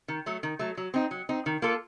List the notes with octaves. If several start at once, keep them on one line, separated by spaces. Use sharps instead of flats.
D#3
F#3 A3
D#3
F#3 A3
F#3
C4 D#4
F#3
C4 D#4
D#3
A#3 F4 A4